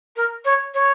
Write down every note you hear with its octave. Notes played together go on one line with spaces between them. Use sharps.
A#4
C#5
C#5